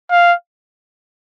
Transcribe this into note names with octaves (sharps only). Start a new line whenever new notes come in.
F5